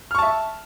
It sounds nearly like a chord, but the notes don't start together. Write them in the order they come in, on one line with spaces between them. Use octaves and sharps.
F6 C#6 A5 E5